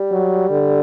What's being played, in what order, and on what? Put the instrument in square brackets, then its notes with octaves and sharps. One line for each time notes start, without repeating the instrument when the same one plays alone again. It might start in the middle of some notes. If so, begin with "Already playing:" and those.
Already playing: [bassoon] G3
[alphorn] F#3
D3